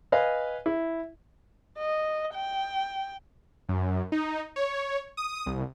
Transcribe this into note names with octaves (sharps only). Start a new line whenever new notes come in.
B4 D#5 F5 G#5
E4
D#5
G5
F#2
D#4
C#5
D#6
C2